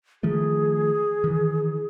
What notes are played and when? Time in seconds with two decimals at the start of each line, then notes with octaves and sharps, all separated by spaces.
0.23 D#3 F3 A3 G#4
1.24 D#3 E3